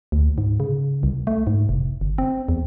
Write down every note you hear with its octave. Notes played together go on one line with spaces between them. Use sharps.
D2
G#2
C#3
C2
A3
G#2
F1
G1
C4
E2